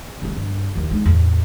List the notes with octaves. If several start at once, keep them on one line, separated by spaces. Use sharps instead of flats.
C3 G3
G2
D#2 D#3
G#3 D#4
A1 E2